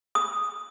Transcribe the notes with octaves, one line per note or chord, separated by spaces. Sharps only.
D#6